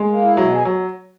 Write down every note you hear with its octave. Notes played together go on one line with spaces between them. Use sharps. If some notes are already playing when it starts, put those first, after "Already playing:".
Already playing: G#3
A#3
E4
B2 F#3
G#4
F#3